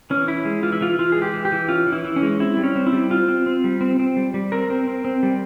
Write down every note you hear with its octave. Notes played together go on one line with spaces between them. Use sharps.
E3 C#4
C#4 E4
G#3
E3 F4
E4
E3 F4
E3 F4
G#3 G#4
G4
E3
G4
E3
C#4 F4
E3
E4
E3
C#4
G#3
C4 E4
G3
C#4
C4
E4
G3
C4 F4
C4
C4
G3
C4
C4
G3
G3
C4 A#4
C4
C4
C4
G3